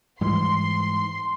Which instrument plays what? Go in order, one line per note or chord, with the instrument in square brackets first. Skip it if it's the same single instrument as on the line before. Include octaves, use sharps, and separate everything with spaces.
[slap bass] G#2 E3 G3 [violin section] C6